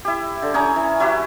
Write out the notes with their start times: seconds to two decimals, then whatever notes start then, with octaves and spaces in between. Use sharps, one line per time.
0.05 E4 G4
0.42 D3
0.54 C#4 G#4 G#5 A#5
0.76 E3
1.00 F#3 E4 G4 B4